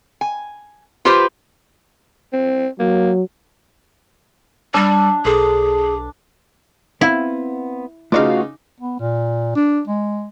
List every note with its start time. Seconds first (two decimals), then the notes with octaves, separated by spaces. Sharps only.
0.21 G#5
1.05 F4 G4 B4 C5
2.33 C4
2.79 F#3 A#3
4.74 G3 D4 E6
5.25 B1 G#4 A4
7.01 B3 C4 E4 F5
8.12 C#3 A3 D#4 F4 F#4 B4 F5 D6
8.80 B3
9.00 A#2
9.56 D4
9.88 G#3